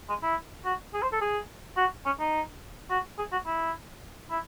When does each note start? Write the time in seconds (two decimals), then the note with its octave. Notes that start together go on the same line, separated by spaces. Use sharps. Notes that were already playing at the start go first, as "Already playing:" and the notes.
0.09 G#3
0.22 E4
0.65 F#4
0.94 G#4
1.02 C5
1.12 A4
1.22 G#4
1.77 F#4
2.06 C#4
2.20 D#4
2.90 F#4
3.19 G#4
3.32 F#4
3.46 E4
4.31 E4